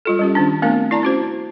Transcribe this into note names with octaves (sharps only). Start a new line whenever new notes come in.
G3 F4 A4
G3 C#4 G4
D#3 C#4 D4
A3 B3 C4 D4 A#4 F5
E4 D5 A5 A#5
C#4 F#4 C5